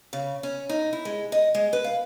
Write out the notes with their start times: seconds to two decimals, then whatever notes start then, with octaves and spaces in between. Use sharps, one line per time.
0.13 C#3
0.43 C#4
0.69 D#4
0.93 E4
1.05 G#3
1.32 D#5
1.55 G#3
1.73 B4
1.84 F5